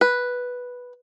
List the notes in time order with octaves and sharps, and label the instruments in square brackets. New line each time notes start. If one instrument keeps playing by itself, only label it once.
[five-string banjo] B4